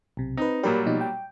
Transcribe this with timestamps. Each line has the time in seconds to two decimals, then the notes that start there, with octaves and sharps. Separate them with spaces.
0.17 B1 C3
0.37 C4 D#4 B4
0.63 A#2 F#3 G3 G4 A#4 B5
0.86 B2 F3 D#4
1.01 G5